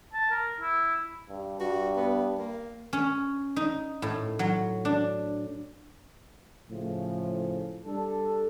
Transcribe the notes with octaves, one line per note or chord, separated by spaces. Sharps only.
A5
A#4
E4
G2
G2 F#4
B3
A#3
C#4
D#4
A2
F#3
D4
A2 C#3 F3
G3 D4 A4